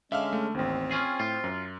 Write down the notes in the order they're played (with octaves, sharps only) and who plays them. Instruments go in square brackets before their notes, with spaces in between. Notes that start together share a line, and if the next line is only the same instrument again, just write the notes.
[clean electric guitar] D3 [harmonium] G#3 C#4 [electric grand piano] E5 F5 F6
[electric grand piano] A3
[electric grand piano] A1 D#2 [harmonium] C4
[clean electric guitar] C#4 F4 G#4
[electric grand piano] A2 [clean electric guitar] F4
[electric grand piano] F#2